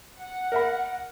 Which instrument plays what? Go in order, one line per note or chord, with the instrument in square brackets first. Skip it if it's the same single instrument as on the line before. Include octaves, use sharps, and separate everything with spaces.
[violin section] F#5
[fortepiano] A#4 E5 B5